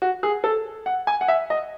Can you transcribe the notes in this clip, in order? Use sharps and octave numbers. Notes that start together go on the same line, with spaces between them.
F#4
G#4
A4
F#5
G#5
F#5
E5
D#5